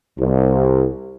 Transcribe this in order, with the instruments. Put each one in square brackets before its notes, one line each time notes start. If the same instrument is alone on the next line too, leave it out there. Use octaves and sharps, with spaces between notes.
[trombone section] C2